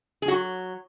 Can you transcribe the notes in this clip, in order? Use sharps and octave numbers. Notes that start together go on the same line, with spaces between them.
G#4
F#3 F#4